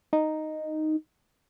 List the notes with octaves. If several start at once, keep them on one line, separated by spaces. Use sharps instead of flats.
D#4